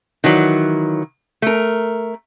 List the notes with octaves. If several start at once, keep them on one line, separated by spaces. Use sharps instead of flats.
D#3 E3 F#3
A3 A#4